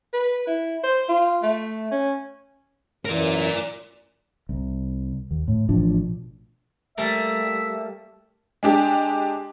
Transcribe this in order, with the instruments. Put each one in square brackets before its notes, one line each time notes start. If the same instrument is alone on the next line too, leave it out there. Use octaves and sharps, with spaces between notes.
[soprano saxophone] B4
E4
C5
F4
A3
C#4
[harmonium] F#2 E3 [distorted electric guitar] A#4 D5
[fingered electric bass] C2
D#2
A2
A1 B2 F3 D4
[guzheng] G3 A3 A#3 [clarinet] E5
[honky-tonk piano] G#3 D4 G4